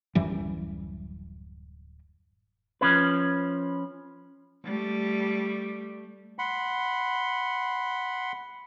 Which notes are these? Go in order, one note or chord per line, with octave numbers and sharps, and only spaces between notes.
D1 F#2 E3 G3
F3 C#4 B4
G3 A3
F#5 B5 C6